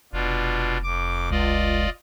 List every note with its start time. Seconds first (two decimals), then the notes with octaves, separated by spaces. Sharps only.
0.13 F1 B2 D4 F4
0.83 F2 D6
1.31 C#2 F4 D5 D#5